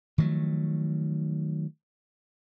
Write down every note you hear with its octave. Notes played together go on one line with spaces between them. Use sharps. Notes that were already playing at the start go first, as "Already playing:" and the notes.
D#3 F3 F#3 A3